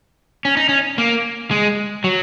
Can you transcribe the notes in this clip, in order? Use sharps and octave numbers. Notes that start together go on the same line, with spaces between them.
C#4
D#4
C#4
A#3
G#3
F#3